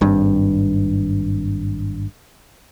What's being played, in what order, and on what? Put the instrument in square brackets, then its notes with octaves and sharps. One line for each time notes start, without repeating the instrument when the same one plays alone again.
[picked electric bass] G#1 G2